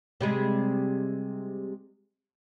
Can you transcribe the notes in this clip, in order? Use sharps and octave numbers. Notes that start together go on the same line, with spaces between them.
C3 G3 G#3